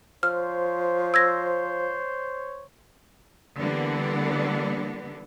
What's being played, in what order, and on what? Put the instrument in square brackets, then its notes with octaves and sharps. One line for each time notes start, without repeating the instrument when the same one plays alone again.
[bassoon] F3 [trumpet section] C5 C#5 [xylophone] F6
[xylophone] E6 G#6 A#6
[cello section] D3 E3 G3 A#3 B3 D4